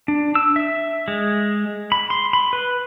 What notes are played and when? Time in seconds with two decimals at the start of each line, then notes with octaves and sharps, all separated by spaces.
0.08 D4
0.35 E6
0.56 E5
1.08 G#3
1.92 B5
2.10 C6
2.33 B5
2.53 B4